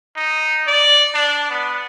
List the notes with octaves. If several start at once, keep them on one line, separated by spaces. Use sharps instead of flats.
D#4
D5
D4
B3